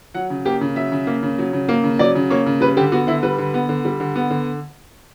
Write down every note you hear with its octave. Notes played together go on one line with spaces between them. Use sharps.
F#3 F#5
C#3
A#3 G4
C#3
F#3 E5
C#3
A#3
C#3
F#3
C#3
A#3
C#3
F#3 D5
C#3
A#3 C#5
C#3
G3 B4
D3 G4
B3 F#4
D3 E4
G3 B4
D3
B3
D3
G3
D3
B3
D3